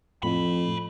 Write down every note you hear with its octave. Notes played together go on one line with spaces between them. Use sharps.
F2 A2 A4 B5